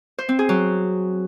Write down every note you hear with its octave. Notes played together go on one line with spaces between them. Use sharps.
C5
C4
G#4
F#3